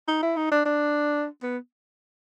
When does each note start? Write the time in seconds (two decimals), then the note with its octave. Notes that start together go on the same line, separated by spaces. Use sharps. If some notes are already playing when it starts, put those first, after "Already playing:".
0.08 D#4
0.23 E4
0.36 D#4
0.52 D4
0.66 D4
1.43 B3